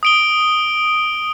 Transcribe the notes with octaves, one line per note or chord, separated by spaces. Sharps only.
D#6 D7 G7